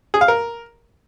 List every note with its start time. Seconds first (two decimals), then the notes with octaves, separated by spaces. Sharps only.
0.14 G#4
0.21 F5
0.28 A#4